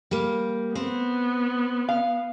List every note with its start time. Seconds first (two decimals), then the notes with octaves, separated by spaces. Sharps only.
0.11 G3 A#3
0.75 B3 C4
1.89 F5